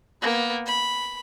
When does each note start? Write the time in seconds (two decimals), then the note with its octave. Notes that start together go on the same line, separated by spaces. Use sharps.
0.22 A#3 B3
0.66 B5